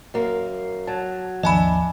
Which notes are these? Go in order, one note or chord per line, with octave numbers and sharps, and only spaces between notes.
F#2 A#3
F#3 A5
G#1 D#2 F3 D4 D#5 E5 G#5 B5